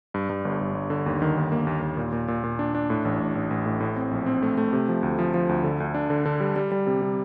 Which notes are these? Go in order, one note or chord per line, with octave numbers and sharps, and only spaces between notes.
G2
G2
G1
G1
G1
D3
D#2
D#3
D#2
A#3
D#2
D#2
A#2
A#2
A#2
A#2
D4
D4
A2
A1
A1
A1
A1
A2
A2
C4
A#1
C4
A3
A3
C3
F3
D2
F3
F3
D2
D3
D2
D4
D3
D3
G3
G3
G3
C3
C3